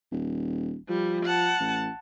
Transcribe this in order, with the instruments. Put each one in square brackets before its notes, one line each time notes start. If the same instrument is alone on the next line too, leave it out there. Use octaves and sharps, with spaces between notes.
[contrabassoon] D#1
[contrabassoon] F3 [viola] G3
[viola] F#5 A5
[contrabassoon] A1